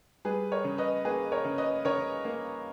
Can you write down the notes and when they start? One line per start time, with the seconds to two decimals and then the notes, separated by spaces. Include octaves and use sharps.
0.25 G3 G#4 B4
0.52 A#4 C#5
0.64 C#3
0.78 B4 D#5
1.05 A#3 G#4 B4
1.32 A#4 C#5
1.45 C#3
1.58 B4 D#5
1.85 C#3 A#4 C#5
2.25 A#3